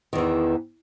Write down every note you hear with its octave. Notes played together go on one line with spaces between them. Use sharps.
E2 D#3 E3